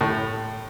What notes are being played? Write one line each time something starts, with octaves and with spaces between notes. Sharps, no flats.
A2